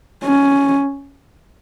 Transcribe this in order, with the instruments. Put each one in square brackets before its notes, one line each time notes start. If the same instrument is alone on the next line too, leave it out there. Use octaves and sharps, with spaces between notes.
[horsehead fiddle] C#4